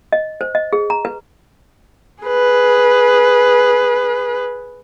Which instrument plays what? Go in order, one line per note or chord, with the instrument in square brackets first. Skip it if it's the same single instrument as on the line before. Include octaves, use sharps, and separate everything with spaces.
[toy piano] D#5
C5
D#5
G#4
A#5
B4
[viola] G#4 B4